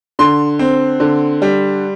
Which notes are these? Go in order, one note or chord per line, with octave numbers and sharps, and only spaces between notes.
D3 C6
C4
D3
G3